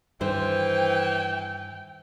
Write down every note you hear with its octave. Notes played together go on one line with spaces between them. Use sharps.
G2 D#3 E3 C5 G5